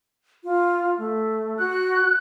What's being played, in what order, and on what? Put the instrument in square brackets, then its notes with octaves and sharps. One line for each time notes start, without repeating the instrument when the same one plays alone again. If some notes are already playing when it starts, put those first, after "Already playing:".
[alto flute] F4
A3
[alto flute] F#4 [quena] F#6